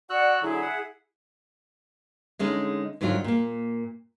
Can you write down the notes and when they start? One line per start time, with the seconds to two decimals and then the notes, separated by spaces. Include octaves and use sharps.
0.10 F#4 D5 F#5 E6 F#6
0.42 D3 F#3 E4 G#4
0.62 F#5
2.39 D3 G#3 A3 C#4 D#4
3.01 G#2 D3 D#3 F#3 D4 F4
3.24 A#2 A#3